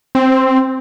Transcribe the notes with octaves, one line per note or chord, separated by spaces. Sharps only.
C4